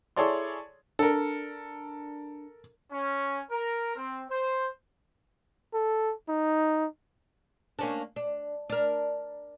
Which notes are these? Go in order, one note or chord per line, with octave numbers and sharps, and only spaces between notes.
E4 G#4 A4 C#5 D5 C6
D4 A4 A#4
C#4
A#4
C4
C5
A4
D#4
A#3 C#4 D4
D4
D4 A#4